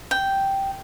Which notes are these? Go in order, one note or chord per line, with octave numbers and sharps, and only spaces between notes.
G5